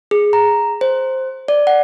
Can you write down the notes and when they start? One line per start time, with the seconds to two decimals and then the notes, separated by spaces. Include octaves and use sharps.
0.11 G#4
0.33 A#5
0.81 C5
1.48 D5
1.67 F#5